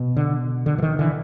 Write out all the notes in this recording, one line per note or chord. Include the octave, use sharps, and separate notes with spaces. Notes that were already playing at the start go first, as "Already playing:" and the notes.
Already playing: B2
D3
D3
E3
D#3
D3 E3